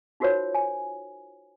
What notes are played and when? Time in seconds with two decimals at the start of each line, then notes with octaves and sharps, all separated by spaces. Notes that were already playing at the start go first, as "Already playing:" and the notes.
0.20 D#4 F4 F#4 A#4 C5 C#5
0.55 G#5